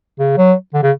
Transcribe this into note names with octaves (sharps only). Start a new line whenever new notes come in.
C#3
F#3
D3
C#3